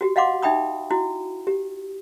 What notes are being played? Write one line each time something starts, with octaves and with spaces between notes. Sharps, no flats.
F#4 G4
D#5 F5 F#5 C6 D6
D#4 E5 G5 B5 D#6
E4 F#4
G4